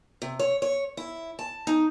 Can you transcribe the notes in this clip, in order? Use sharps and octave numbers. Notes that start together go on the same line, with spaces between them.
C3
C#5
C#5
E4
A5
D#4